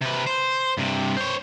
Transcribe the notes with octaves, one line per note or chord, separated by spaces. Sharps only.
C3 B4
C5
G2 C3
C5 C#5